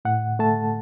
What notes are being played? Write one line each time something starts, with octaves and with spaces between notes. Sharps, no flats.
A2 F#5
A3 A5